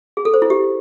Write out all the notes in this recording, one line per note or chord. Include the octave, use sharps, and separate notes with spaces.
G#4
A4
C5
E4
G4